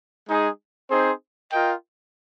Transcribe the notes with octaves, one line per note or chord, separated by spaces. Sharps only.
G#3 D#4 G#4
C4 D#4 G#4 C5
F4 A#4 D#5 G5